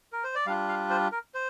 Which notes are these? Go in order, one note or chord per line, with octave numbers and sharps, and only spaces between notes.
A#4
C5
D5
G3 D4 F4 F5
F5
C5
A#4
C5